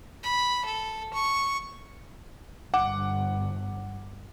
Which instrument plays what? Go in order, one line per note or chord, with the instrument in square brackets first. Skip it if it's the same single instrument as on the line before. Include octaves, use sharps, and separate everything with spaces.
[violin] B5
A4
C#6
[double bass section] G1 [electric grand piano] F#5 D6